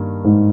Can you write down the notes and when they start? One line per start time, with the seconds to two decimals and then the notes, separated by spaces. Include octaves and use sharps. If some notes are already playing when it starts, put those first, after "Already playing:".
Already playing: G2 D#3 A#3
0.25 G#2